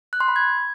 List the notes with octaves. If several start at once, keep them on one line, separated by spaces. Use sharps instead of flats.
F#6
C6
B5
G#6